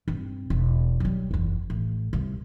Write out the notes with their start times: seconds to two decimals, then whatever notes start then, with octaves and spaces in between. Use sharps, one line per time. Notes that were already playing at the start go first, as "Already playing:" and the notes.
0.08 G2 C4
0.50 E1
1.00 F#3 G3
1.31 F#1 E2
1.70 A1
2.13 C2